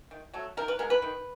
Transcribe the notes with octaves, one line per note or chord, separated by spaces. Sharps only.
D#3
F#3 A3
D#3 A#4
B4
G#3 B3 A#4
B4
D#3